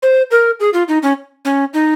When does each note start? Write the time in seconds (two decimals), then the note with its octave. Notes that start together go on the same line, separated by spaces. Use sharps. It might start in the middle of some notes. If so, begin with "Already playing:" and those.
0.03 C5
0.31 A#4
0.60 G#4
0.73 F4
0.88 D#4
1.03 C#4
1.45 C#4
1.74 D#4